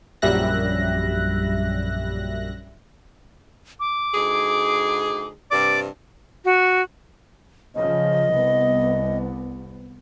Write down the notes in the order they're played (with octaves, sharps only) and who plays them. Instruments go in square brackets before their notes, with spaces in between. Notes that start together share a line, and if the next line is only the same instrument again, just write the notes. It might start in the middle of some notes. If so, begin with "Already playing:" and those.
[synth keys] A#1 F#2 G3 E5 F#6 A#6
[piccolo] D6
[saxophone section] D2 D#4 G#4
[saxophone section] G2 C3 [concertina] D5 D6
[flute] F#4
[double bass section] C#3 F3 [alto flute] D#5
[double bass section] C2 B3